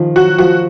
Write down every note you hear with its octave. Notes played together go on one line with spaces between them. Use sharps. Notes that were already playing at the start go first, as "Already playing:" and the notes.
Already playing: D#3 F3
F#3 F#4
F3 F#4